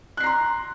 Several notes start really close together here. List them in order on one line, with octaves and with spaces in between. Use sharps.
F#6 C7 A#5 C6